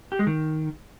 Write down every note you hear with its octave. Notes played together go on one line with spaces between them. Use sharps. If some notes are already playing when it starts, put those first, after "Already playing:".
G4
G#3
D#3